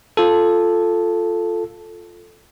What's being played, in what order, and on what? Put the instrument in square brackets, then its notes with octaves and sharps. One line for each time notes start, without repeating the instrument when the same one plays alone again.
[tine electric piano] F4 A4